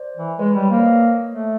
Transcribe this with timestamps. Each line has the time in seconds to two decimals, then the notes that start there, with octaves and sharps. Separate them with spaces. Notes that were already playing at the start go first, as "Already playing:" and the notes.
Already playing: C5 D5
0.17 E3
0.39 G#3 B4 C#5
0.51 B4
0.55 G3
0.62 B4 C#5
0.70 A#3 C5 D5
0.85 C#5 D#5
1.32 A3